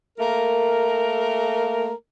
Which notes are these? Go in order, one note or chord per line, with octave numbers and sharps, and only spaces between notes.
A3 A#3 A#4